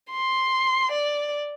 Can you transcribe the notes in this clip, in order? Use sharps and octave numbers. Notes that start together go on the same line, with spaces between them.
C6
D5